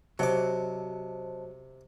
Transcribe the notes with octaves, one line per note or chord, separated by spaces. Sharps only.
C3 F#3 C5 D#5 A5 D6